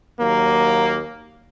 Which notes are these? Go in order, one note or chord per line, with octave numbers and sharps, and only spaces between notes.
D#2 F#3 A#3